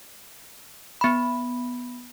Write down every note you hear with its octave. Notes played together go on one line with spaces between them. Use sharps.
B3 B5